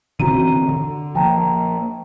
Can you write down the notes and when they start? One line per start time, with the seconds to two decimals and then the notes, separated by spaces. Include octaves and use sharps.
0.20 D3 E3 C4 F#4 A#5 D#7
0.69 D3
1.15 F3 A#3 G5 A5 A#5